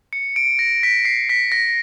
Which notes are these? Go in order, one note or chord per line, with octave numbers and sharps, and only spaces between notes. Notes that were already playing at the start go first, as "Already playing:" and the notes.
C#7
D7
A#6
B6
C7
B6
A#6